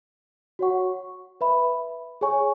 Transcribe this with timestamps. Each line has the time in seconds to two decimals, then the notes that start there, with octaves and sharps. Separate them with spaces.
0.59 F#4 C#5 F#5 C#6
1.41 B4 E5 B5
2.21 G#4 C#5 G#5 C#6